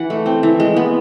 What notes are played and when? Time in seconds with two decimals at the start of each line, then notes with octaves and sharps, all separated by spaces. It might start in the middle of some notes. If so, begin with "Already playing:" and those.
Already playing: E3 F#5
0.10 A3
0.26 C4
0.43 E3
0.60 G#3
0.76 B3